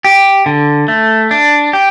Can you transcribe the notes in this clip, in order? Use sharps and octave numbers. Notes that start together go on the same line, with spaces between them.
G4
D3
A3
D4
G4